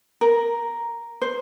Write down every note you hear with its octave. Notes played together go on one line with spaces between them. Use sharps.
A#4
C5